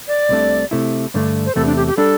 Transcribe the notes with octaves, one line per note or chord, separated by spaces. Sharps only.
D5
C2 C3 A3 D4
C3 A3 E4
G2 D3 A3 D4
C5
E2 C3 A3 A4
D4
G4
G4
G3 D4 A4